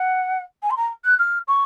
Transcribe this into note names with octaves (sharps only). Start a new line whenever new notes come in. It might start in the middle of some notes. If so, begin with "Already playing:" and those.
Already playing: F#5
G#5
C6
A#5
F#6
F6
C#6